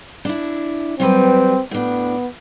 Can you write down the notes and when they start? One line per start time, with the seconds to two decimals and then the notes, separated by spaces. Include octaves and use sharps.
0.25 D4 E4
1.00 F#3 G3 C4 B4
1.71 A2 B3 D4